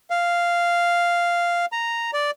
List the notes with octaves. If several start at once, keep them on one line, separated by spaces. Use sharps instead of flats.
F5
A#5
D5